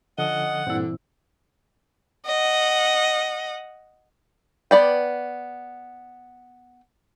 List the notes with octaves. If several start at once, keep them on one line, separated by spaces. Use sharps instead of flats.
D3 F3 C#4 F4 A4 D#5 F#5
G2 A#2 D3 E3 C4 E4
D#5 F#5
B3 D5 G5